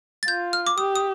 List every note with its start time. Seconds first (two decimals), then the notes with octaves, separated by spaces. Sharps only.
0.23 A6
0.28 F4 G6
0.53 F6
0.67 D6
0.78 G4 D#6
0.96 D#6